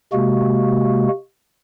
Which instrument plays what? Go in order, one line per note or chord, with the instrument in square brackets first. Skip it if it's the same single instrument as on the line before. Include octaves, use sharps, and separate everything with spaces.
[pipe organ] C3 G#3 A#3 F#4